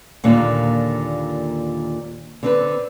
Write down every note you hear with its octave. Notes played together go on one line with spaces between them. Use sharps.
D#2 A#2 D3 G3
D3 C4 B4